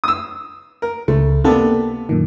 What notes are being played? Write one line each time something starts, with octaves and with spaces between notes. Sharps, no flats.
D#6 E6
A#4
C#2 A3
C3 A#3 B3 D4 A4
F#2 A#2 D#3